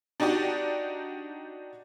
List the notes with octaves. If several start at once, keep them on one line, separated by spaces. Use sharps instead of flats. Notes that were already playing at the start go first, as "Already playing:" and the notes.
D4 D#4 F#4 G4 D5